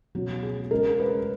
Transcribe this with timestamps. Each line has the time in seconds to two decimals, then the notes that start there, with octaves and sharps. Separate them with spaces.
0.15 B2 F#3 C#4 F#4
0.43 G#4
0.71 C#3 G#3 C#4 A#4
1.00 B4